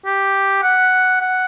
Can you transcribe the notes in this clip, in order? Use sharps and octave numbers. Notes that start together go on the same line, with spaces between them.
G4
F#5
F#5